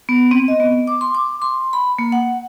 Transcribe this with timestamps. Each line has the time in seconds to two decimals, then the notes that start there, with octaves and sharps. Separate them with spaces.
0.09 B3
0.31 C4
0.48 D#5
0.60 B3
0.87 D6
1.01 C6
1.15 D6
1.42 C6
1.73 B5
1.99 A#3
2.12 F#5